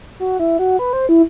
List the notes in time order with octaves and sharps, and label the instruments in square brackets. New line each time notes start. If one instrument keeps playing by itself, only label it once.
[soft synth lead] F#4
E4
F#4
B4
C5
E4